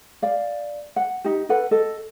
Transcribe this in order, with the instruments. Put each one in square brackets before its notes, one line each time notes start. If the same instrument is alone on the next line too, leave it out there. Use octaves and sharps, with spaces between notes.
[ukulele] D5 F5
F#5
D#4 G4
A4 B4 F#5
A4 D#5